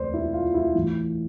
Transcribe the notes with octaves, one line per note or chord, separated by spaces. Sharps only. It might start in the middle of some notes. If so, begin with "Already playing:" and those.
Already playing: E1 D2 C3 B4 C5 D5
E4
F4
E4
A2 E3